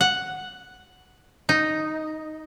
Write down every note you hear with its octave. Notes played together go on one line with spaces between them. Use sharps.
F#5
D#4